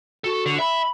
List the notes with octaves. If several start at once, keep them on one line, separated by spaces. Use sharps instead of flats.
F#4 A4
D3
E5 B5